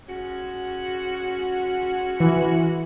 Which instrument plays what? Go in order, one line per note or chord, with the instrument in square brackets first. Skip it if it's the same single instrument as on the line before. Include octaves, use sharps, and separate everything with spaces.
[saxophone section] G#3 C#4 F#4
[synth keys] E3